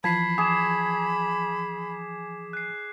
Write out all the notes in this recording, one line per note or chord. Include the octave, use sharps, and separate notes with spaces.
E3 F3 A5 B5 G#6 B6 C7
G#4 D6 E7
F#6 C7